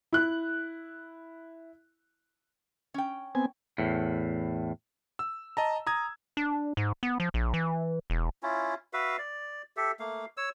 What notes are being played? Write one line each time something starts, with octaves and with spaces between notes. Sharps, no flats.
E4 F#6
C#4 G5
B3 C4 G#5
E2 A2
E6
D#5 A5 A#5
A#5 D#6 G#6
D4
G#2
B3
F3
A#1
E3
E1
C#4 E4 F4
F#4 B4 E5 F5
D5
G4 A4 E5
A3 A#3 F5
C#5 E6